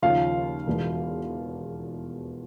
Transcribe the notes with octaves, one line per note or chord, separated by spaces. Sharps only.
D#2 C#3 F3 F4 F5
E1 E2 B2